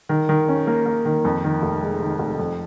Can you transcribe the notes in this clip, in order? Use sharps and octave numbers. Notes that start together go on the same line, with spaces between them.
D#3
D#3
C#4
A#3
A#3
D#3
F2
D#3
F1
G#3
D#3
F1
F2